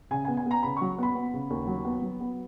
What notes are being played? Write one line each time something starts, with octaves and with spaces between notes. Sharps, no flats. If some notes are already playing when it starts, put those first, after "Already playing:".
C#3 G#5
G#5
B3
G#5
B3 A#5
C#3 B5
F#3 C#6
B3 B5
B3
C#3
D#2
F#3
B3
F#3
B3